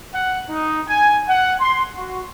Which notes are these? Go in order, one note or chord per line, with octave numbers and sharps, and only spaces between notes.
F#5
D#4
G#5
F#5
C6
F#4